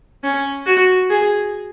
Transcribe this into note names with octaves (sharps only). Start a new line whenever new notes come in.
C#4
F#4
G#4